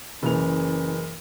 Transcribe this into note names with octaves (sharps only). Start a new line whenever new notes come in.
F#1 E3 C#4 F7